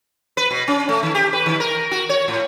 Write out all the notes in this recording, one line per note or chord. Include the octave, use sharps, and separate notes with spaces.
B4
B2
C#4
A3
D#3
G4
B4
D#3
A#4
F#4
C#5
A2